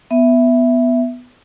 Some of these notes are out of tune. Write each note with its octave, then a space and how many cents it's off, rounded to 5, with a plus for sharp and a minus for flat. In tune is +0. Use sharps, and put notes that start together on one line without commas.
B3 +5 E5 +0